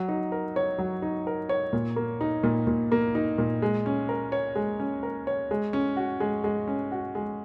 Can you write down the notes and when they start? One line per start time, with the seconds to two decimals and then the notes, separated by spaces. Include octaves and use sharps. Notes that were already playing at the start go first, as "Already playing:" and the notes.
Already playing: F#3
0.09 D#4
0.32 A#4
0.56 C#5
0.79 F#3
1.02 D#4
1.27 A#4
1.49 C#5
1.73 A#2
1.96 A#3
2.21 D#4
2.43 A#2
2.67 A#2
2.92 A#3
3.15 D#4
3.38 A#2
3.62 G#3
3.86 C#4
4.09 A#4
4.32 C#5
4.55 G#3
4.80 C#4
5.03 A#4
5.27 C#5
5.51 G#3
5.73 C#4
5.97 F#4
6.20 G#3
6.44 G#3
6.68 C#4
6.92 F#4
7.15 G#3